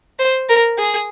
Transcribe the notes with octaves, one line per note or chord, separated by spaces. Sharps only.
C5
A#4
G#4